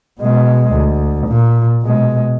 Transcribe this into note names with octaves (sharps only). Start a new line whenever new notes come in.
B2 G#3
D2
A#2
B2 G#3